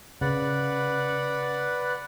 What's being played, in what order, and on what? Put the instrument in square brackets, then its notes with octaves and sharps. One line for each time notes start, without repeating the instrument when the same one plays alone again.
[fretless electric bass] C#3 [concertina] B4 D5 F#5